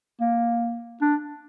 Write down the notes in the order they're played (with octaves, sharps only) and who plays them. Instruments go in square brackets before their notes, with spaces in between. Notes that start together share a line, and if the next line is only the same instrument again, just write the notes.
[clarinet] A#3
D4